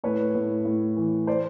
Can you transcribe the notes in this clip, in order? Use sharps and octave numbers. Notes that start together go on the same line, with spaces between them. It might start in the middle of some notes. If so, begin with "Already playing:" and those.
A2 B4 C#5
A2
A2
E3
C5 D5